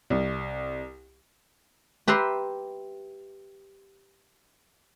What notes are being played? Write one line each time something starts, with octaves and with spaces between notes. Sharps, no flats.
C2
G4 B4 E5 A#5 C6